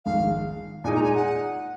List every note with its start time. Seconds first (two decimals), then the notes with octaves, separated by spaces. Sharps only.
0.05 A#1 G#2 D#3 F5
0.84 A#2 G#3 D#4 G#5
0.95 A#5
1.04 G#5
1.15 F#5